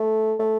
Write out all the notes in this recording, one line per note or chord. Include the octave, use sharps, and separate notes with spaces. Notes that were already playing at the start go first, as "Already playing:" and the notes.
Already playing: A3
A3